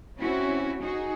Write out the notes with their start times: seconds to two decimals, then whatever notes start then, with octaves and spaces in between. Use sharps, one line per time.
0.19 C4 C#4 E4 F#4 C#5
0.82 D#4 F#4 G#4